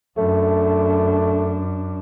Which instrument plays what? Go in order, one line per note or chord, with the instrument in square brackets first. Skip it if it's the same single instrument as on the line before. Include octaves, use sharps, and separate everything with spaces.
[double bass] F#2 D4 [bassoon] A3